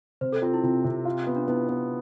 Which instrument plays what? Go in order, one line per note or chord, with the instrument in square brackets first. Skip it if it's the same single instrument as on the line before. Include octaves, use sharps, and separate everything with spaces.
[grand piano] C3 [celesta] C5
[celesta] A4
[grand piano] C4 [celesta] F4
[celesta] E4
[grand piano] C3 [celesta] F4
[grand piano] C3
F4
B3
[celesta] D4
[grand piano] B3 [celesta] E4
[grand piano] B3